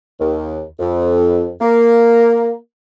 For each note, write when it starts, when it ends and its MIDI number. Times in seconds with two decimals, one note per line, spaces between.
0.20 0.62 39
0.79 1.49 41
1.61 2.54 58